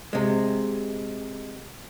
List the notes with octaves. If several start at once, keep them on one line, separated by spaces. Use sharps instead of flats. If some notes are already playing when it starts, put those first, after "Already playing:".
C3 G#3